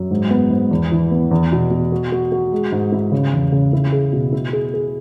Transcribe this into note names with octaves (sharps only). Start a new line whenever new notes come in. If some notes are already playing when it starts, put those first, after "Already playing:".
Already playing: F#2
G#2
B3
G#2
E2
E3
B3
E2
B2
B2
F#4
F#4
F#4
G#3
G#2
E4
C#3
E2
C#3
E4
G#4
B2
E4
G#4
G#4